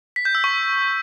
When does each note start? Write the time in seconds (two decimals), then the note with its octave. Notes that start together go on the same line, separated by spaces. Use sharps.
0.16 B6
0.25 G6
0.35 E6
0.44 C#6